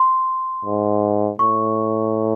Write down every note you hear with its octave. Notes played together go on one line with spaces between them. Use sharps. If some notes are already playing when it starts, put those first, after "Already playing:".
Already playing: C6
G#2
A2 C#6